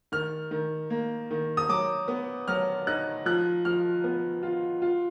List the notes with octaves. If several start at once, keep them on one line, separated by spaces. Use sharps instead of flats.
D#3 F6
D#3
A#3
D#3
D#6
F#3 D6
B3
F#3 F6
D#4 F#6
F3 F#6
F3 F6
B3
F4
F4